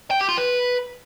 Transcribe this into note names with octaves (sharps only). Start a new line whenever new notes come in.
G5
G4
F4
B4